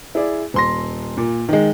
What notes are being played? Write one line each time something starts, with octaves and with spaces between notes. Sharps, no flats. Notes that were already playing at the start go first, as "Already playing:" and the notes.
E4 G#4 D5
D#1 C6 A#6
A#2
D#3 G#3